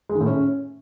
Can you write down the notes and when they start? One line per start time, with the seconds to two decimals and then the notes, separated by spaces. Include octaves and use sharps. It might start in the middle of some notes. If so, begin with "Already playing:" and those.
0.09 G#3
0.15 D#3
0.21 A2
0.26 C#4